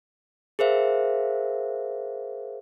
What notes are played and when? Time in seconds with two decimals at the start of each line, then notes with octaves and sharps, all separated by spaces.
0.59 G#4 A#4 C5 E5 F5